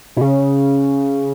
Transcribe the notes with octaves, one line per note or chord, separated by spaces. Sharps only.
B2
C#3